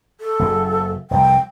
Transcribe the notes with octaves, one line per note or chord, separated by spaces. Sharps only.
A4
F#1 F#2
F1 C2 G5